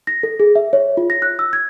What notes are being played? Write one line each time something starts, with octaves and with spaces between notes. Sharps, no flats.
A#6
A4
G#4
E5
C#5
F4
A#6
F#6
E6
G#6